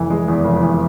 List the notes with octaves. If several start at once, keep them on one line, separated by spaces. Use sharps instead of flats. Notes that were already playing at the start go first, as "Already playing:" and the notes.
Already playing: F1 E3
G#3
E2
F1
E3